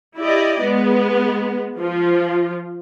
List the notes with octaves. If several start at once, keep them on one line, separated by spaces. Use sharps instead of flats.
E4 G4 D5 D#5
G#3 B3
F3 F4